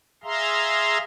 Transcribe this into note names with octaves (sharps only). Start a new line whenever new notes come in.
G#4 E5 F5 A#5 C6